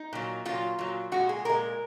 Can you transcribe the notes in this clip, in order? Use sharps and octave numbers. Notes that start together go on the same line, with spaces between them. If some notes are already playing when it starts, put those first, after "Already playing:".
Already playing: D#4
A#2 F#3
A#2 F#3 F4
A#2 F#3
A#2 G#3 F#4
G#4
A#2 G#3 A#4